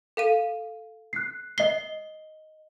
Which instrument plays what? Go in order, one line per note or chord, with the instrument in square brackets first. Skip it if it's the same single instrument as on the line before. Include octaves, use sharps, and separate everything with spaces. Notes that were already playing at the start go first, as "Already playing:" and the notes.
[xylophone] A4 F5 D#7
[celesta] F#6 C7
[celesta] D#5 G7 [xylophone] C7